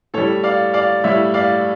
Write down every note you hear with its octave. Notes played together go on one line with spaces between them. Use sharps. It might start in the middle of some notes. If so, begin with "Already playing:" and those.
A2 G3 A4 C#5
D5 F5
D5 F5
A2 G3 C#5 E5
D5 F5